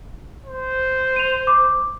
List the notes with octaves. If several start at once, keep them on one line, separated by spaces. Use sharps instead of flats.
C5
D#7 F7
D6